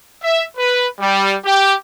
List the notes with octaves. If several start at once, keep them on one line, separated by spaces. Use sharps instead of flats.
E5
B4
G3
G4